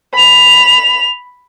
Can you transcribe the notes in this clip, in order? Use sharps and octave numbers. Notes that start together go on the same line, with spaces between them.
B5 F7